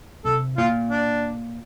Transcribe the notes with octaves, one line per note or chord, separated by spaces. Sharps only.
C3 A4
A#2 F4
D4